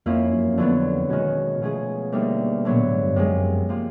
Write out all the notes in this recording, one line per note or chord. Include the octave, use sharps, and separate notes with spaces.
F2 F3 A#3 C#4 E4
F#2
F#2
F2 D3 F#3 B3
B2 D#3 G#3 C#4 F#4
B2 F3 A3 C#4 F4 G#4
D2 D3 G3 A#3 D#4
A#2 D3 F#3 B3
A2
G#2
G2
F#2 C3 F3 G#3
C3 F3 A#3